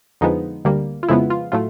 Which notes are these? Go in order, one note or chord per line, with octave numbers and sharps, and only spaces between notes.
F2 D3 F3 G#3 B3 D#4
D2 D3 G3 A#3
F4
F2 C#3 F3 G#3 B3 E4
F4
A2 F#3 A3 F4